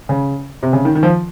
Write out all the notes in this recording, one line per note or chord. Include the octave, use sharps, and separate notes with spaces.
C#3
C3
C#3
D#3
D#3
F3